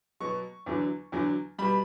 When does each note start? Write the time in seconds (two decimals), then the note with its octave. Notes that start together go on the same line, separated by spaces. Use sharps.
0.20 B2 F#3 C#6
0.66 E2 D3 F#3
1.12 E2 D3 F#3
1.58 B2 G3 B5